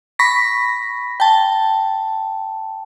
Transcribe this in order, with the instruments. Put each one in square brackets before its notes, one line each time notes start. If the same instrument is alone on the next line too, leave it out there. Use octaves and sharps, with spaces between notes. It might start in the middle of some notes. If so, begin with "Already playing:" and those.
[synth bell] B5 C#6 A#6 B6
G5 A5